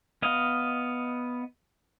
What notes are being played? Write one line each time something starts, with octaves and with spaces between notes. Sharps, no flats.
B3 D#5 F5